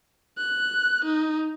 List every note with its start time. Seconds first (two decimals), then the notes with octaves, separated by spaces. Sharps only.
0.38 F#6
1.05 D#4